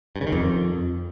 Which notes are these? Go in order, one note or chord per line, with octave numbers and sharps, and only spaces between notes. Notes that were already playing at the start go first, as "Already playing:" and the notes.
G2
C#3
D#3
F2